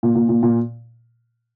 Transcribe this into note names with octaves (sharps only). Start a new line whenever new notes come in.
A#2
A#2
A#2
A#2